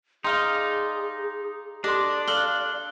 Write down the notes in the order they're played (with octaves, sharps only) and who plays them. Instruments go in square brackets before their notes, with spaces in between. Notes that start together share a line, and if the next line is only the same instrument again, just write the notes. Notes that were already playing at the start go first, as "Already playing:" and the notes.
[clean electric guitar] D#4 [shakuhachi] G#4 [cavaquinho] D5 F5 G5 [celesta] C6
[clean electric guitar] D4 [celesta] G4 A4 C6 [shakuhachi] D5 [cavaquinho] D#5
[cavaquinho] A4 F5 [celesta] F#6 F#7 G7